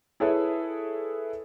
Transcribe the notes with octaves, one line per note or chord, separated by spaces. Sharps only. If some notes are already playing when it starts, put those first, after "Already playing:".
E4 G#4 A4 B4 C#5 E5